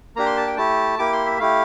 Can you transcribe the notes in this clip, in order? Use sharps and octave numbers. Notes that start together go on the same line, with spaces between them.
A#3 D4 G4 A#5
C6
A5
G5
A3 E4 G4 A5
A#3 E4 G4 D6
C6
E5
A3 E4 G4 F5